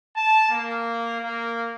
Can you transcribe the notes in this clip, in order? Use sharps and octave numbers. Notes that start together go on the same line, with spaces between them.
A5
A#3
A#3